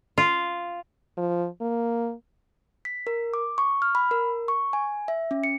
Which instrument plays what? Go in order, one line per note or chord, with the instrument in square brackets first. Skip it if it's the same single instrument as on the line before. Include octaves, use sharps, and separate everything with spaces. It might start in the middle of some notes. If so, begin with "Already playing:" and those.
[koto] F4
[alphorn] F3
A#3
[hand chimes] B6
A#4
D6
C#6
F6
B5
A#4
C#6
G#5
E5
C#4
C#7